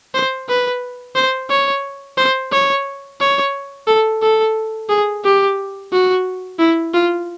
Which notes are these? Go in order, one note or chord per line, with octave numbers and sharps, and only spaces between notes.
C5
B4
C5
C#5
C5
C#5
C#5
A4
A4
G#4
G4
F#4
E4
F4